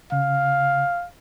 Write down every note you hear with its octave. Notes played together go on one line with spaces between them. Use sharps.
C#3 F5